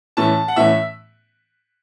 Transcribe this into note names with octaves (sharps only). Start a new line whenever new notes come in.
A2 E3 A3 C#4 A5
F#5
A2 E3 A3 C#4 E5